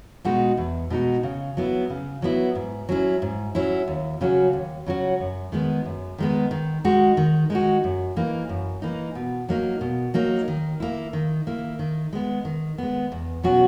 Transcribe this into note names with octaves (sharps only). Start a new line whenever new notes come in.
B2 G#3 D#4 F#4
E2
B2 G#3 D#4 F#4
C#3
F#3 B3 E4
C#3
F#3 B3 E4
G#2
F#3 C#4 E4
G#2
F#3 C#4 E4
D#2
C#3 F#3 C#4 F#4
D#2
C#3 F#3 C#4 F#4
F#2
D#3 G#3 B3
F#2
D#3 G#3 B3
D#3
G#3 D#4 F#4
D#3
G#3 D#4 F#4
F#2
E3 A#3 D#4
F#2
E3 A#3 D#4
B2
F#3 A#3 D#4
B2
F#3 A#3 D#4
D#3
A#3 E4
D#3
A#3 E4
D#3
G#3 B3
D#3
G#3 B3
E2
B2 F#3 C#4 F#4